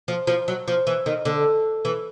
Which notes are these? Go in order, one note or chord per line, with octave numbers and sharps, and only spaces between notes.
F3
F3
F#3
F3
E3
D#3
D3
E3